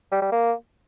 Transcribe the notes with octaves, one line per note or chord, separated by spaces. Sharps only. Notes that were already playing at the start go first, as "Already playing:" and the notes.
G3
G3
A#3